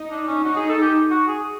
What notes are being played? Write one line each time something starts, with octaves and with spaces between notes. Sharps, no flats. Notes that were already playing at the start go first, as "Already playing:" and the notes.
Already playing: D#4
D4
C#4
D#4 F#4
G#4
A4
G4
F#4
G#4